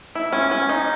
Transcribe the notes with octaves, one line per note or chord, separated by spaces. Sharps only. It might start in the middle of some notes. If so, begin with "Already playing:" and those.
E4
C#4
C#4
D#4